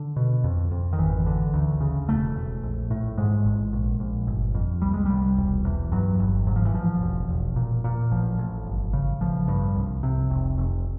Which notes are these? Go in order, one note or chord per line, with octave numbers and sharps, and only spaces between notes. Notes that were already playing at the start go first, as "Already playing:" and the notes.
Already playing: D3
B2
F2
F2
D#3
G#1 E3
D3
D2
C#3
E1 A3
E1
A#1
A2
G#2 G#3
A1
A#1
A#1
G1
F2
C2 G3
G#3
C2 G3
E1
E2
G2 F#3
G1
G#2 F#3
F3
E3
A1 F3
E1
E1
A#2
A#2
A1 F3
A1
G1
C#3
A1 F3
G2
C2
C3
F1
F1